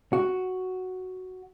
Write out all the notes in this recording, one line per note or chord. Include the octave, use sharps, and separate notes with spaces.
F#4